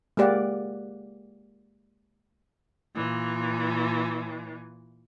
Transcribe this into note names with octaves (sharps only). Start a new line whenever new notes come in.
G#3 A#3 G4 D5 F5 F#5
A#2 E3